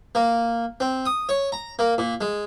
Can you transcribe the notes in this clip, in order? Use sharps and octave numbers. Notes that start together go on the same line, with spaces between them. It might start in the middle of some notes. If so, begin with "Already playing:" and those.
A#3
C4
D#6
C#5
A#5
A#3
A#2
G#3